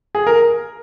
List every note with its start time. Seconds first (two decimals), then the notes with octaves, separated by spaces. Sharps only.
0.15 G#4
0.27 A#4